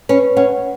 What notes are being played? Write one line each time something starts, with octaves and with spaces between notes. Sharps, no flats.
C#4 B4
C#4 F#5